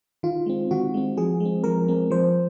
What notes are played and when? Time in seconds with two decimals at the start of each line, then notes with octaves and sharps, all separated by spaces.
0.23 D#3 F4
0.46 G#3 C4
0.71 D#3 F#4
0.94 G#3 C4
1.17 F3 G#4
1.40 G#3 C4
1.64 F3 A#4
1.88 G#3 C4
2.11 F3 C5